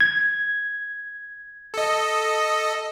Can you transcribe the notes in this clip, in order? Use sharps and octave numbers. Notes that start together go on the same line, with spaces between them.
G#6
A4 D#5